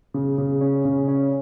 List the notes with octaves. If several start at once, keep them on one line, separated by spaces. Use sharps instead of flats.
C#3
C#3
C#4
C#3
C#4